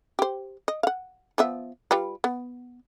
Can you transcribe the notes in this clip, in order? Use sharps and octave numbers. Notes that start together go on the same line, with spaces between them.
G4 C5
D#5
F5 F#5
F3 B3 E5
G3 F4 B4
B3